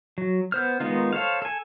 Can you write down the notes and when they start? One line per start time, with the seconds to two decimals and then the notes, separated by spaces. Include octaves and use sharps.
0.18 F#3
0.52 B3 C5 F6
0.80 D#3 G#3 B3 D#4 F4
1.13 A4 C5 C#5 F5
1.42 A4 G#5